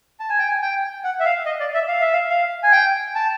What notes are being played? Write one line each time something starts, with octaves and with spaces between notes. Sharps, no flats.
A5
G#5
G5
G#5
G5
F#5
E5
F5
D#5
D5
E5
F5
E5
F5
F5
G#5
G5
A5